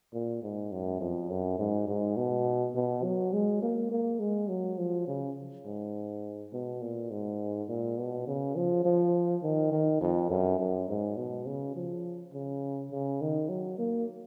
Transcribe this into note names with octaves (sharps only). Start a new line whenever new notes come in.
A#2
G#2
F#2
F2
F#2
G#2
G#2
B2
B2
F#3
G#3
A#3
A#3
G#3
F#3
F3
C#3
G#2
B2
A#2
G#2
A#2
B2
C#3
F3
F3
D#3
D#3
F2
F#2
F#2
G#2
B2
C#3
F3
C#3
C#3
D#3
F#3
A#3